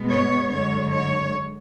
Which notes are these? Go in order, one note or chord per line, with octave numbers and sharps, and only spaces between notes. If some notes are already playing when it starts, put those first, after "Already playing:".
Already playing: B2 G#3 B3
C#5
F#2 D3 G#3 C#5
C#5